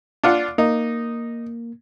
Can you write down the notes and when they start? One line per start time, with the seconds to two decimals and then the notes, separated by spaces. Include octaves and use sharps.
0.24 D4 F4 F#5
0.58 A#3 D#4